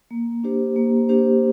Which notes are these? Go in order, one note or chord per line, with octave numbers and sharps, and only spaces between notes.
A#3
D4 G4 C5
A#3
D4 G4 C5